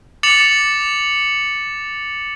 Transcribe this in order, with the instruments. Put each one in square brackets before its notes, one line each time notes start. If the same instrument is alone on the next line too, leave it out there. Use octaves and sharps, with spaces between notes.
[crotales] D6 A6 C#7 F7 F#7